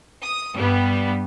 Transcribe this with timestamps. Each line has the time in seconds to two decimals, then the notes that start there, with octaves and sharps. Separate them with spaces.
0.23 D#6
0.55 G2 G3 B3